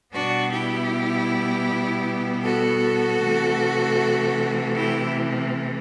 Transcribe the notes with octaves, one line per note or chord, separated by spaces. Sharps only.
B2 G3 B3 D4 F#4
E4 G4
F#4 A4
C3 E3 A3
E4 G4